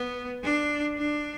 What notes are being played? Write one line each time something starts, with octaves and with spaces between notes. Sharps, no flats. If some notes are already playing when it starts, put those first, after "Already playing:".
Already playing: B3
D4
D4